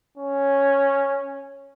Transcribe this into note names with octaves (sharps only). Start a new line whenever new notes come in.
C#4